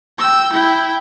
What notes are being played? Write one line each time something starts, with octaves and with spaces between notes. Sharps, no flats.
G5 E6
E4 G5